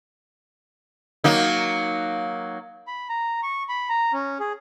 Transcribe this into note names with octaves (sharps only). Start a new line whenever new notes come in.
F#3 A#3 D#4
B5
A#5
C#6
B5
A#5
C#4
G#4